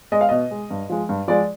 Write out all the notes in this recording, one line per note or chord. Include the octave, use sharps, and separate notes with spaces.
G#3 D#5
F5
B2 D#5
G#3
G2
F3 G#3
G2
F3 G#3 D5